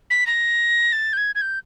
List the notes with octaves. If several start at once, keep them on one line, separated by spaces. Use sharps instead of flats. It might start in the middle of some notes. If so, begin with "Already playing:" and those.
B6
A#6
A6
G6
G#6
G#6
G6